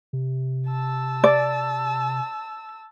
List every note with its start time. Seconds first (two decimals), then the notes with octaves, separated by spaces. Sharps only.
0.13 C3
0.69 A5 E6
1.24 D5